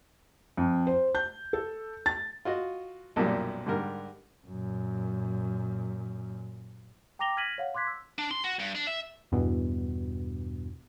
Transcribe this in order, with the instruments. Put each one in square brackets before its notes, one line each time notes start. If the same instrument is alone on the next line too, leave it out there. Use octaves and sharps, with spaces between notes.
[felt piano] F2
C5
G6
A4
A6
[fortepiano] F4 F#4 D#5
B1 F#2 A#2 F3 G3
G#2 D3 G3 A#4
[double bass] F#2 A#2
[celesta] G5 A#5 D6 A#6 F7 G7
F6 G#6 A#6 B6 D#7 F#7
C#5 F5 F#5
C6 D6 F#6 G#6 B6
E6
[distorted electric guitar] D4
C6
F#4
G2
D4
E5
[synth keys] E2 G2 B2